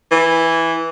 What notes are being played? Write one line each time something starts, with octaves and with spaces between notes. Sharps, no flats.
E3